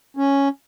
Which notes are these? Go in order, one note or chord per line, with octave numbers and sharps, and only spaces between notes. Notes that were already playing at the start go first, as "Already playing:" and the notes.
C#4